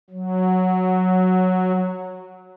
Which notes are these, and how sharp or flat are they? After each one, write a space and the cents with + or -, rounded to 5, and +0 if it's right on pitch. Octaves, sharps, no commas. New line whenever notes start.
F#3 -5